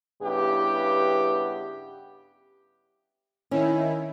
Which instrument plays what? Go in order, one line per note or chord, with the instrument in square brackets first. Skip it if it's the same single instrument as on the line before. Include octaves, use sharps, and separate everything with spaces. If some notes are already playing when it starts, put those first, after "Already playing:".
[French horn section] G2 C#3 B3 E4 G4
[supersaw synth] D#3 E4 [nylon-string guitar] C#4